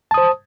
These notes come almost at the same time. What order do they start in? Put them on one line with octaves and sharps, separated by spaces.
A5 D#6 C5